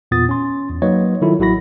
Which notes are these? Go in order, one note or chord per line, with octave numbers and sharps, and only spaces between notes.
E2 A#2 B3 F4 D#6 A6
C#4 C6
E2
F#3 A#3 D#4 B4 C#5 D#5
D#3 F#3 G3 E4 F4 A4
A1 F#3 E4 F#4 B5 A#6